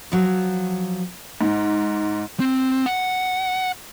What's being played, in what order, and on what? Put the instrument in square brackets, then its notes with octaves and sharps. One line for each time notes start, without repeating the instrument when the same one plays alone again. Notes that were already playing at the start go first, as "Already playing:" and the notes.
[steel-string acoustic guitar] F3 F#3
[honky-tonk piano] G#2
[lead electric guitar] C4
F#5